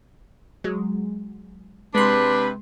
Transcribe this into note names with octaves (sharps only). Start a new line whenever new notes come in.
F#3 G#3
C3 G#3 D4 B4 C6